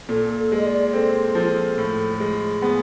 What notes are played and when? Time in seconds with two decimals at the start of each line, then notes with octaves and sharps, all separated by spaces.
0.09 A#2 A4
0.38 A4
0.52 G#3 D#5
0.66 D5
0.93 C4 A4
1.35 F3
1.78 A2
2.20 G#3
2.62 B3 G#4